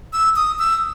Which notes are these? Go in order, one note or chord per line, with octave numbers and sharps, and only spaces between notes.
E6
D#6
E6